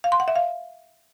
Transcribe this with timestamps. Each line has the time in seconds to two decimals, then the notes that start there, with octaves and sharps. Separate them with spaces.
0.04 F5
0.12 C6
0.20 F#5
0.28 E5
0.36 F5